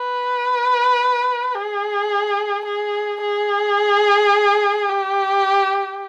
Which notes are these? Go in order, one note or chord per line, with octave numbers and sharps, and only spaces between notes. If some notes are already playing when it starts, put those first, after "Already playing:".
Already playing: B4
G#4
G#4
G#4
G4